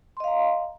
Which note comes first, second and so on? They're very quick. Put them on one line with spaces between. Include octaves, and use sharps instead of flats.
C6 D#5 F5 A#5